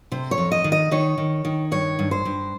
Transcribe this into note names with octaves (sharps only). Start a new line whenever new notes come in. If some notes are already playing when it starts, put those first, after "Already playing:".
C3 C5
C#5
F2
D#5
D#3
D#5
D#3 C#5
D#3
D#3
G2 C#5
G2
C5
G2